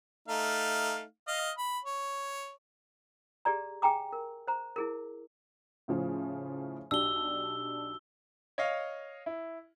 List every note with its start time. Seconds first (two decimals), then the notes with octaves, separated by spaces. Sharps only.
0.28 A3 D#4 F5
1.28 D#5 F5
1.58 B5
1.85 C#5
3.45 G4 G#4 D5 A#5
3.82 G#4 G5 G#5 A#5 D6
4.13 A#4
4.48 C5 A#5
4.76 E4 G#4 A#4
5.88 A2 C#3 F3
6.91 B1 D4 G4 E6 G7
8.58 C#5 D#5 F5
9.26 E4